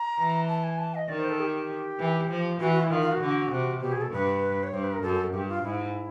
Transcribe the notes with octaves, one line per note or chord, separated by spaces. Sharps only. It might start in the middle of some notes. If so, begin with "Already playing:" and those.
Already playing: A#5
E3
A5
G#5
A5
D#5
D#3 D5
C5
A4
G4
E3
F3
E3 F#4
F#4
E4
D#3 F4
F4
F#4
D3
C3
B2 G4
G#4
A4
G2 B4
C#5
G2 C5
B4
A#4
F#2 A4
A4
G2 G4
F4
G#2 E4